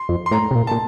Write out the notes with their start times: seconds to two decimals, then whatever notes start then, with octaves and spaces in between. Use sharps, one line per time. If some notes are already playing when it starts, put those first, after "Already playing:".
Already playing: C6
0.09 F2
0.26 C6
0.31 A2 A#5
0.51 C3
0.55 A#2
0.67 A#2 A5